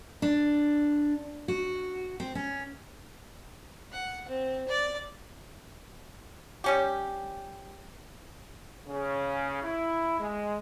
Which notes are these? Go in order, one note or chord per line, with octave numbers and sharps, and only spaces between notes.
D4
F#4
C4
C#4
F#5
C4
D5
G3 C#4 G4
C#3
E4
G#3